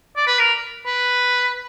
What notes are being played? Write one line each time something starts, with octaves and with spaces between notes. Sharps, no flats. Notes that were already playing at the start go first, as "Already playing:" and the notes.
D5
B4
A#4
B4